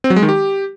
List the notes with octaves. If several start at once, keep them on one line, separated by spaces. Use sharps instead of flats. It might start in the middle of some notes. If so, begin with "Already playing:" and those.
C4
F#3
G#3
D#3
G4